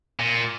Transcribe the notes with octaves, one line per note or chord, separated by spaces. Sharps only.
A#2